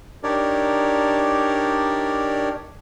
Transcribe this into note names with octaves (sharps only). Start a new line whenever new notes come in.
D4 D#4 G4 A#4 C#5 D5